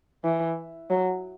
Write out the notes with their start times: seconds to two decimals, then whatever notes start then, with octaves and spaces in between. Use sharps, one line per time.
0.24 E3
0.90 F#3